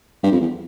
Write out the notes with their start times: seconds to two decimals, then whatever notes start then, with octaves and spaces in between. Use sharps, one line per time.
0.23 G2
0.32 F2
0.41 E2